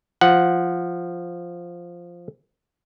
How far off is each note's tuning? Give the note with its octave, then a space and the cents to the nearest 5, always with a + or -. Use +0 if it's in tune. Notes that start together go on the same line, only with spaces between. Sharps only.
F3 +0 F#5 +0